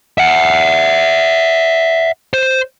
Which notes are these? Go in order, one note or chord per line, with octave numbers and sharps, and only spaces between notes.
E5 F#5
C5